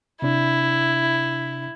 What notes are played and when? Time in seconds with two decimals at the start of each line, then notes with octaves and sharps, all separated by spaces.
0.22 C3 D4 E4